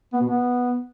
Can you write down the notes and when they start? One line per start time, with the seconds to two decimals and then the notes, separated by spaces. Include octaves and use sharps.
0.13 B3
0.21 B2
0.28 B3